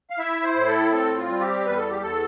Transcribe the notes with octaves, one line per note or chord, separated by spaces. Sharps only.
F5
E4 E5
C5
A2
A4
C4 A4
F4
G3
G4
E2 B4
A4
G4
E2 A4